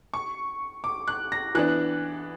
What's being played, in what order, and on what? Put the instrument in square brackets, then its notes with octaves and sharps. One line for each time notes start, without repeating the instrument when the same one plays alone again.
[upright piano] C#6
D6
F#6
A#6
[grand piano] E3 B3 D4 [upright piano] F#6